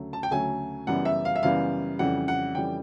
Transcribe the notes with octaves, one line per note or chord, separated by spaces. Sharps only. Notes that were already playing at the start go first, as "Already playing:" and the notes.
Already playing: D2 C#3 F#3 A3
A5
G5
D2 C#3 F#3 A3 G#5
F#2 C#3 E3 G3 B3 F#5
E5
F5
E5
F#2 C#3 E3 G3 B3 F5
F2 C#3 E3 G3 F#5
F#5
F2 C#3 E3 G3 G5